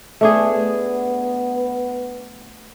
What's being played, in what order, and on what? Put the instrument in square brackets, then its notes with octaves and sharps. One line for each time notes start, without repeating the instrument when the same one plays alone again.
[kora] A3 D4 G#4 [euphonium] B3